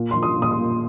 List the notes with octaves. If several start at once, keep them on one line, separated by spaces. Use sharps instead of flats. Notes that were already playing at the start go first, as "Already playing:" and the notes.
Already playing: A#2
F3 C6
D#6
A#2
D#6
C6
A#2